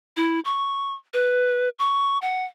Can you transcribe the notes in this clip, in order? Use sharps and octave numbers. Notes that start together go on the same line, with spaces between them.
E4
C#6
B4
C#6
F#5